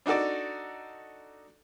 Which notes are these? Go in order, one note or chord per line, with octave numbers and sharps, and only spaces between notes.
D4 D#4 F#4 A4 D5